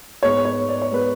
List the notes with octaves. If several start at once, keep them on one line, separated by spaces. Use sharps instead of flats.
G#2 G#3 B3 C#5
C#5
D5
C#5
G#3 B3 B4